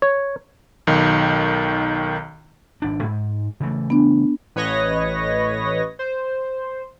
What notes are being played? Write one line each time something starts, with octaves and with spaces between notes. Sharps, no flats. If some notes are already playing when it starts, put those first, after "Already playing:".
C#5
B1 D#3
G#1 D4
G#2
C#3 E3 A3
B3 D4
A1 B4 C#5 D#5 A#6
C5